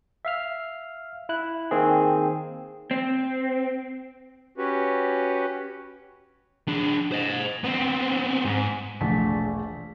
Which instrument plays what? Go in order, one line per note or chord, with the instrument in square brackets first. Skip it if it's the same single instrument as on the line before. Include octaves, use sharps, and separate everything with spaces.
[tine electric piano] E5 F5 F6
E4 F#6
D#3 A#3 C4 G#4
[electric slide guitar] C4
[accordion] C#4 F#4 G4 B4
[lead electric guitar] D4 G#4
C5 D#5
B3 C4
G#2
[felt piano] E1 A#1 A3 F#5 A5 B6